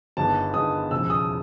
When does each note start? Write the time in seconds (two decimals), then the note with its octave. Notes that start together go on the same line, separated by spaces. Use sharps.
0.17 G1 G2 D#3 G#3 B3 A5
0.54 G1 G2 D#3 G#3 B3 D#6
0.91 E1 D#2 C#3 F3 E6
1.10 D#6